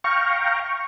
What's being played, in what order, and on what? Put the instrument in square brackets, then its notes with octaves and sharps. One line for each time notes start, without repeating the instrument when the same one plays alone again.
[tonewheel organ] F5 G5 A#5 [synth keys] C#6